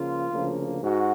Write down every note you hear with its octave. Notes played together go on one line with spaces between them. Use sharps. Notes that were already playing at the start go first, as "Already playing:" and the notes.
Already playing: C#2 C#3 F3 A#3 F4
D2 C#3 F3 A#3
G#2 F#4